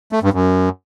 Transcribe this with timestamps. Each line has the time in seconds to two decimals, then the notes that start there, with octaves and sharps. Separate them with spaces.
0.12 A3
0.23 G2
0.33 F#2